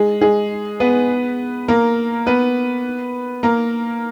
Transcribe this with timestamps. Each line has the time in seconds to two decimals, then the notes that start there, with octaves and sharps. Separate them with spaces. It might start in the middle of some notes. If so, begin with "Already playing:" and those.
Already playing: G#3 G#4
0.21 G#3 G#4
0.80 B3 B4
1.68 A#3 A#4
2.26 B3 B4
3.43 A#3 A#4